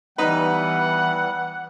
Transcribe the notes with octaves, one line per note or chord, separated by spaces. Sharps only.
E3 G3 B3 D#4 B4 F#5